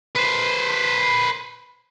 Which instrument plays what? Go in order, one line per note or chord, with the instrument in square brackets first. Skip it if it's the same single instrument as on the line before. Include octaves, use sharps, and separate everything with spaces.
[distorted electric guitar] B4 C5